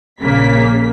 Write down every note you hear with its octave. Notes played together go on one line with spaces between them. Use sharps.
A#1 C#3 A#3 B6